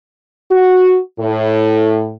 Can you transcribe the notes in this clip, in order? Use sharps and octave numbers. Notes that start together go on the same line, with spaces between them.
F#4
A2